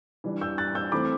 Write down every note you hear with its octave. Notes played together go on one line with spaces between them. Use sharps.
E3 G3 D4
E6 G6
F#6 A6
E6 G6
E3 A3 C4 B5 D6